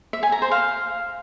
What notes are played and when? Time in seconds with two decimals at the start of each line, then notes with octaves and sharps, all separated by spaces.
0.13 E5
0.23 G#5
0.32 A#5
0.42 C5
0.51 F5